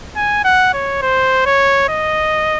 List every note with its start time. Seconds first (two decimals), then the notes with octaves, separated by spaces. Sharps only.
0.16 G#5
0.45 F#5
0.74 C#5
1.02 C5
1.46 C#5
1.89 D#5